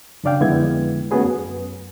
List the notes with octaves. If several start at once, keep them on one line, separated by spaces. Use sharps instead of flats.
F#2 C#3 D4 D5 F5 G5
F2 D3 G#3 B3 E4 G#6
A3 B3 C#4 F#4 G#4 B4
F#2